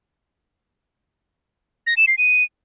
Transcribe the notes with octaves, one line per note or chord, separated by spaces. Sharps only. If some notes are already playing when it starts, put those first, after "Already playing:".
A#6
E7
C7
D#7